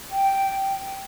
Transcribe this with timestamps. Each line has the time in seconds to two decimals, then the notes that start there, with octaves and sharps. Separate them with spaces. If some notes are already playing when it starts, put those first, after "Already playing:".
0.11 G5